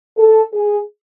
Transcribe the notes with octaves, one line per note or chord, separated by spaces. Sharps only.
A4
G#4